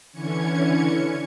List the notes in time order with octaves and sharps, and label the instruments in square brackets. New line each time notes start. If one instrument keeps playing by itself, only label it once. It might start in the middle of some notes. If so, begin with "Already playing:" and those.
[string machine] D3 E3 C#4 G#6 C#7